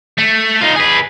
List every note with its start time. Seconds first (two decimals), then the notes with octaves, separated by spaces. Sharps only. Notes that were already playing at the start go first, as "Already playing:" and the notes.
0.18 A3
0.61 D#4 F4
0.76 G#4 B4